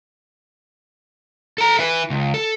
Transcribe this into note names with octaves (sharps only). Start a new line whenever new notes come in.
A4 A#5
E4 B4
C#2
A4